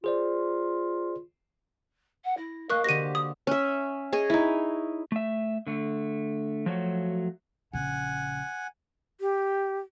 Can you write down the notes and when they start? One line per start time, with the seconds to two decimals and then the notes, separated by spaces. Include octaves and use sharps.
0.04 F4 G#4 C5 D5
2.24 F#5
2.37 E4 A#6
2.70 A#3 A#4 D#5 F5 C#6 D6 F#6
2.84 D3 F#4 G4 C5 A#6 D#7
3.15 D#6
3.47 C#4 E5
4.13 G#4 C#5 D#5 G#5
4.30 D#4 E4
5.12 A3 E5
5.67 D3 A3
6.66 F3 F#3 A3 F#4 C#5
7.73 A#1 C#3 F#5 G#5
9.21 G4